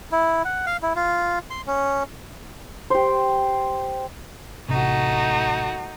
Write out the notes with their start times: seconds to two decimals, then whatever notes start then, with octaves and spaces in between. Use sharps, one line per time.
0.12 E4
0.45 F#5
0.66 F5
0.83 E4
0.96 F4
1.50 C6
1.67 C#4
2.90 G4 C5
4.68 A1 C3 A3 D#4 F#4